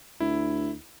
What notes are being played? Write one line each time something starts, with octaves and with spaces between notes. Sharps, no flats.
D2 E4